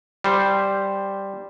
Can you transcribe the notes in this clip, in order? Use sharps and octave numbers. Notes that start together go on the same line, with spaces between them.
G3 C5